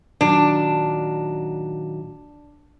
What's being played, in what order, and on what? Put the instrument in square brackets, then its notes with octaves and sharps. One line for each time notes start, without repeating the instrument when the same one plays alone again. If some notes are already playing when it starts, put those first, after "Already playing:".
[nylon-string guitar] A#2 D#3 F#3 [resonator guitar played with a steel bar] D4